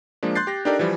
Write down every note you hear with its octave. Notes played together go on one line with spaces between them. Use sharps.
F3 G#3 A#3 D4
C6 F#6 G6 A6 C7
G4 A#6
D4 D#4 G4 A4 A#4 D5
E3 F3 G3